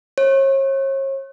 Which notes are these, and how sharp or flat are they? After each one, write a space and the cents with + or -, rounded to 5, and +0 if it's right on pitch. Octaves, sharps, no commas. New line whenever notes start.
C#5 -40